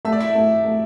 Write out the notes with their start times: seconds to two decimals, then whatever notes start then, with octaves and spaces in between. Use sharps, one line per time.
0.05 A3 E5
0.12 D5
0.20 E4 E5
0.35 A3
0.65 A3